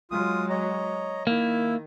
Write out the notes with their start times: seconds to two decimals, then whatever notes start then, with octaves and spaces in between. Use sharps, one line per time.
0.11 F#3 G#3 F4 D#6
0.50 C#5 D#5 A#5
1.27 D#3 A#3 E4 E5